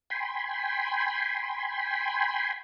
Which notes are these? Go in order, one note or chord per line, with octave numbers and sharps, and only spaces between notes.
G5 G#5 B5 C6